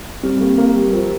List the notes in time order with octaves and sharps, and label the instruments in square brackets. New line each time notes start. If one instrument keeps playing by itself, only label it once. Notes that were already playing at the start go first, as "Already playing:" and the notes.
[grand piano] G3 [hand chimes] C4
[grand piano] A#3 [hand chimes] G4
[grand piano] A#3 [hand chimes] A#4
[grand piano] G3 [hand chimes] G4
[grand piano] F3 [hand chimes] A#4